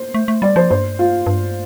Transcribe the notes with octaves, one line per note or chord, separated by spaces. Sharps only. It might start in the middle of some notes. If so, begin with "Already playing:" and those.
Already playing: C5
A3
A3
G3 D5
F3 C5
G2 C5
F4
G2